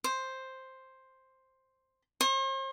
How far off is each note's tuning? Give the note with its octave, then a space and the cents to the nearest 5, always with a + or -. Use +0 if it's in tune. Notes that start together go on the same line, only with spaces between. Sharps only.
C5 +5
C5 +45